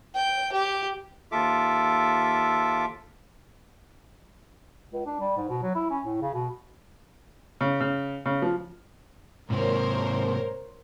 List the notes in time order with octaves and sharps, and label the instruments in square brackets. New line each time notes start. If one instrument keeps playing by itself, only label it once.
[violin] G5
G4
[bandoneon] D#2 F4 A4 E5 D6
[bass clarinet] C#2
D4
G3
G#2
B2
F#3
E4
C#4
A2
C#3
B2
[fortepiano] C#3
C#3
C#3
F3
[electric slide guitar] G#2 C3 [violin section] A#4 C5 C#5